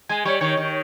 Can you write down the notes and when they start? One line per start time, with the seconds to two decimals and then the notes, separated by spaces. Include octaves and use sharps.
0.09 G#3 G#5
0.25 G3 C#5
0.41 D#3 C#5
0.57 D#3